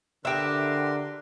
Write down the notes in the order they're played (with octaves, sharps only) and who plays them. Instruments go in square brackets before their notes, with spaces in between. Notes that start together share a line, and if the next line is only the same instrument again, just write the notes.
[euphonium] D3 [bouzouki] G4 E5 [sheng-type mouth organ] A#4 B4 C6